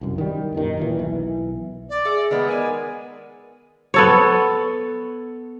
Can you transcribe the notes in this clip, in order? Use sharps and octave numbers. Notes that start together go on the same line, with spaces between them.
C2 F#2
D#3 G3
F#2 A#2 D#3
D#2 A#2 E3
B1 E3
D5
G#4 E5 E6
D#3 G#3 B3
A#4 D5 G#5
B3 A4 C#5